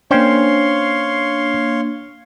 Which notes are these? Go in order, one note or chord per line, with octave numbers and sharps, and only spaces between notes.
A#3 C#4 D4 C5 C#5 F5 G5 C6